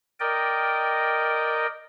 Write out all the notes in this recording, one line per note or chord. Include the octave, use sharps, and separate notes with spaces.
A#4 D5 D#5 G5